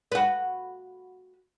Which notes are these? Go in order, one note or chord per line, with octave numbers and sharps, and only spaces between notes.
F#4 B4